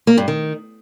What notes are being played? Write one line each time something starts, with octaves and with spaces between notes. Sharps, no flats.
A#3
G2
D#3